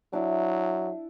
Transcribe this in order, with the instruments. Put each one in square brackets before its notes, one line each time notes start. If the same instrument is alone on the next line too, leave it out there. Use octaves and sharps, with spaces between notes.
[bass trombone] F#3 [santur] D4 E4